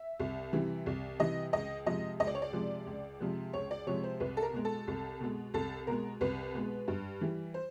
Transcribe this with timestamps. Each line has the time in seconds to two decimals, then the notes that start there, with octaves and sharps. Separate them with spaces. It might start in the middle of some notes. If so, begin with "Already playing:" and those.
Already playing: E5
0.20 C2
0.53 C3 E3 G3
0.86 C2
1.19 C3 E3 G3 D#5
1.53 C#2 D#5
1.86 C3 F3 G#3 D#5
2.20 C#2 D#5
2.27 D5
2.35 C#5
2.42 D5
2.53 C3 F3 G#3
2.86 C#2
3.20 C3 F3 G#3
3.53 C#2 C#5
3.71 D5
3.87 C3 F3 G#3 C#5
4.04 C5
4.20 C2 B4
4.37 A4
4.42 A#4
4.53 B2 G#3
4.65 A4
4.87 C2
5.20 B2 G#3
5.54 C2 A4
5.87 B2 G#3 A#4
6.21 C2 B4
6.55 B2 G#3
6.88 G2
7.21 E3 G3
7.54 C5